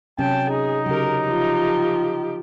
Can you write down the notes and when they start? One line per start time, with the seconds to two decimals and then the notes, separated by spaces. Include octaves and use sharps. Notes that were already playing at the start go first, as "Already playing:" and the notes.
0.19 C3 F#3 C#4 G5 A5
0.49 D#4 G#4
0.86 C#3 F#3 G4 A#4
1.24 F3 G4